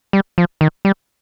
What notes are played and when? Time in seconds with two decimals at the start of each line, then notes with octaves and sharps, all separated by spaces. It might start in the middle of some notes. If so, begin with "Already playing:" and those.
0.13 G3
0.38 F3
0.61 D#3
0.85 G3